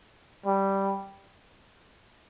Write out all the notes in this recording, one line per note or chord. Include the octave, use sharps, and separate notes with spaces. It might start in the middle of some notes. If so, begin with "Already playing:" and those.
G3